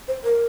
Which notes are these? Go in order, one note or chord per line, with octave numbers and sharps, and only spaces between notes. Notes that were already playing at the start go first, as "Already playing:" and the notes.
C5
A#4